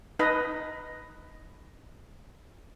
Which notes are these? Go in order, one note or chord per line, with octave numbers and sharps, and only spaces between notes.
D#4 B4 D#5